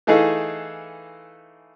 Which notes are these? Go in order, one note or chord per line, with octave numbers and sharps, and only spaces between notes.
E3 A3 D#4 G#4 A4 F5